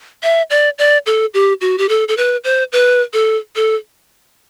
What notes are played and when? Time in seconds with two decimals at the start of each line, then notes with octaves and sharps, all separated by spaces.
0.23 E5
0.50 D5
0.79 D5
1.06 A4
1.34 G4
1.61 F#4
1.78 G4
1.89 A4
2.08 A4
2.17 B4
2.44 C5
2.72 B4
3.13 A4
3.56 A4